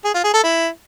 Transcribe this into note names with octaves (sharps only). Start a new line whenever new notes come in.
G#4
F4
G#4
A4
E4